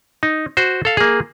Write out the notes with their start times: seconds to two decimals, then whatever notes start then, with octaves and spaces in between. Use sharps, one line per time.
0.23 D#4
0.57 F#4 C5
0.85 A4 F5
0.97 A#3 G#4